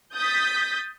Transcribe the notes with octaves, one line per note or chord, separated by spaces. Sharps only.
D#6 G6 A6 B6